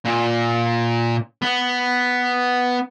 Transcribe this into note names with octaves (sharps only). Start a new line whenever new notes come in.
A#2
B3